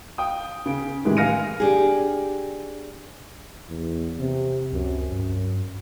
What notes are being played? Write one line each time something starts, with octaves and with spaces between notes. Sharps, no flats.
F5 G5 D#6
C#3 D7
A2 D#3 E3 G3 G#3
F5 G#5 F6 A#6 C#7 D#7
D4 G4 G#4
E2
C3
C#2 F#2
G2